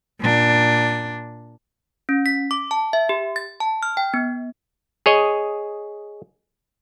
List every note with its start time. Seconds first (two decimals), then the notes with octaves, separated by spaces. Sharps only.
0.20 A#2 D4
2.09 C#4
2.26 B6
2.51 D6
2.71 A5
2.93 E5
3.09 G4
3.36 A6
3.60 A5
3.83 F6
3.97 G5
4.14 B3
5.06 G#4 C#5 D#5